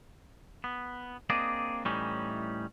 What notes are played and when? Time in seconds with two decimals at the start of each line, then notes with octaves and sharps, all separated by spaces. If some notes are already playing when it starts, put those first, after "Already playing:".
0.64 B3
1.30 A#3 C4 D4 G#4 D5 D#5
1.85 A2 E3 G3 C#4 D#4